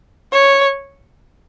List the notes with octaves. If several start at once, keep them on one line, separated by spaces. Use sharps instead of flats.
C#5